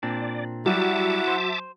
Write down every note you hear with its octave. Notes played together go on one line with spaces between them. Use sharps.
A#2 C4 D4 D5
F#3 G3 E4 F#4 E5 F#5 A5 D6
C5